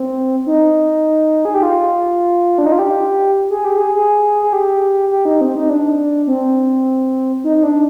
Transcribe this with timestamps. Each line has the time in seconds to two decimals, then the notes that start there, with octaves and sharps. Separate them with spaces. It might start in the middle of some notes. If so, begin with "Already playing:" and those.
Already playing: C4
0.47 D#4
1.45 G#4
1.54 G4
1.63 F4
2.58 D4
2.66 D#4
2.72 F4
2.79 G4
3.50 G#4
3.65 G4
3.78 G#4
3.95 G#4
4.42 G#4
4.53 G4
5.11 G4
5.25 D#4
5.41 C4
5.56 D#4
5.69 D4
6.27 C4
7.44 D#4
7.57 D#4
7.63 D4